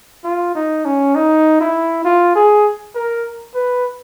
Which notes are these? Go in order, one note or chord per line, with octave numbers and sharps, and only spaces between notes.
F4
D#4
C#4
D#4
E4
F4
G#4
A#4
B4